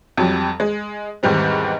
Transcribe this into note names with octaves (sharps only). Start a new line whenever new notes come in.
F2 F#3 G3
G#3
E2 G#2 D#3 G3 C4